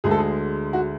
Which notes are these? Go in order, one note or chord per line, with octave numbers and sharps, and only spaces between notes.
D2 D3 G#3 G#4
A4
G#4
F#4